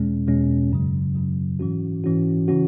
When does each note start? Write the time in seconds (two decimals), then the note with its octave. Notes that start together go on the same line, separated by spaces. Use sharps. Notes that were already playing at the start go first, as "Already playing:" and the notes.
Already playing: E2 B2 G#3 C#4
0.27 E2 B2 G#3 C#4
0.71 F#2 C#3 F#3
1.15 F#2 C#3 F#3
1.59 G#2 E3 C#4 F#4
2.04 G#2 E3 C#4 F#4
2.48 C#3 E3 C#4 F#4